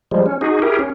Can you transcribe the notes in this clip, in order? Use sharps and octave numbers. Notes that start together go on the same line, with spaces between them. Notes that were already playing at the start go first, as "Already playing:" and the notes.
F3 G3 G#3
C#4
D#4 F#4 G#4
E4 G4 G#4 A#4
C#4